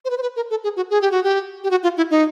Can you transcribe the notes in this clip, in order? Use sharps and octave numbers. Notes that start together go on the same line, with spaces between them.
C5
B4
C5
B4
A#4
A4
G#4
F#4
G#4
G4
F#4
G4
G4
F#4
F4
E4
D#4